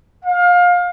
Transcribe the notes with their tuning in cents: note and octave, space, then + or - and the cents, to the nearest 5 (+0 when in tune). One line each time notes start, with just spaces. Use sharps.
F5 +25